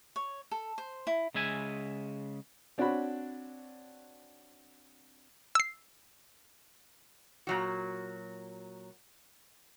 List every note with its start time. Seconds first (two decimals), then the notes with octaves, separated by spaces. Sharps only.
0.16 C#5
0.51 A4
0.78 C5
1.07 E4
1.34 C#3 G#3 E5 G#5
2.78 C4 D4 F#4 C#5 F#5 B5
5.55 E6 C7
7.47 A#2 F#3 F#4